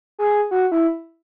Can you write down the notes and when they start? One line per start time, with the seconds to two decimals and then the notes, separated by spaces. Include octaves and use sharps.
0.19 G#4
0.51 F#4
0.72 E4